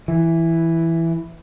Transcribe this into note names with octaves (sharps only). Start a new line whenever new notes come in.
E3